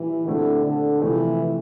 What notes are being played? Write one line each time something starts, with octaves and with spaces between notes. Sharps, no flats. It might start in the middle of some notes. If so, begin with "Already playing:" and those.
Already playing: A#2 E3 G3 G4
A#2 D3 A3 C4 E4 G4
D3
C3 E3 F3 A3